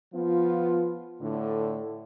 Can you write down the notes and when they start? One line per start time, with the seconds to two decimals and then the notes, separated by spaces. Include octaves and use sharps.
0.14 F3 B3 F4
1.22 A2 D3